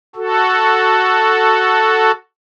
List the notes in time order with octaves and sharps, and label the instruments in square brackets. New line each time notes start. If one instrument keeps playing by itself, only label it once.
[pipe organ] F#4 A4